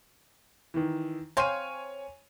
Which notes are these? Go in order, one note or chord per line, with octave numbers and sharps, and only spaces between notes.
D#3 E3
C4 C5 C#5 F5 G#5 D#7